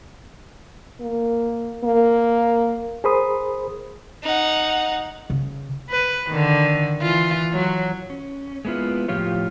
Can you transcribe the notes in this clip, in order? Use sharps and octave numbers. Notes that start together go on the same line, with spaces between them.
A#3
A#3
G#4 A#4 C5 B5 C6 D#6
D#4 F#5
C#3
B4
D3 D#3
E3 F4
F#3
C#4
G#3 A#3 B3 E4 F4
A2 F3 F4 G4 C#5